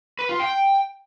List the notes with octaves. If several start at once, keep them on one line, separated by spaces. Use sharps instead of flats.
B4
F4
G5